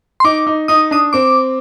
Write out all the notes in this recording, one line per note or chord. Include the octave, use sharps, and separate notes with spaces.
C6
D#4 D6
D#4
D#4 D#6
D4 D#6
C4 D6